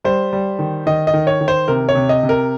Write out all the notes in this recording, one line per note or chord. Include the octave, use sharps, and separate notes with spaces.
G3 C5
G3
D#3
D#3 D#5
D#5
D#3
C#5
D#3
C5
C3 A#4
C#5
C3
D#5
C3
A#4